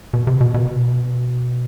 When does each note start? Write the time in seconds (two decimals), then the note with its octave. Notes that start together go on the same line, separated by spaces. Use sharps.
0.13 B2
0.27 C3
0.41 B2
0.54 B2